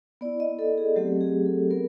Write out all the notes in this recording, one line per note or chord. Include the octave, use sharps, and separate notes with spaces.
B3 E4 D5
D#5
A4
G#4
F#3 A3 C4 G4
G#4
A4
B3 A#4